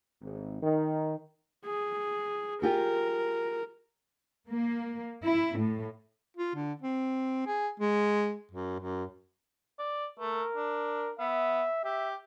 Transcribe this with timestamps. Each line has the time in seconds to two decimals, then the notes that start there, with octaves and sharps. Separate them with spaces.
0.22 G#1
0.63 D#3
1.66 G#4
2.62 F4 G4 G#4 A#4
4.48 A#3
5.23 E4
5.57 A2
6.37 F4
6.56 D3
6.82 C4
7.47 G#4
7.80 G#3
8.52 F#2
8.80 F#2
9.79 D5
10.19 A3 A#4
10.56 D4
11.19 B3 E5
11.85 G4 E5